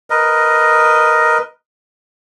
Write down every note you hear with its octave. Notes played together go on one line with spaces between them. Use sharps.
A#4 B4 D#5